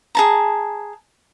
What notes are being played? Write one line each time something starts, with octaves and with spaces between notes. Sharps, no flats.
G#4 A5 A#5